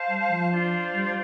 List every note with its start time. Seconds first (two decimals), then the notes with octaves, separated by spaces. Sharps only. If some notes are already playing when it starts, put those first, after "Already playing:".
Already playing: C5 F5 A5
0.09 G3
0.29 F3
0.51 D4 F4 C5
0.93 G3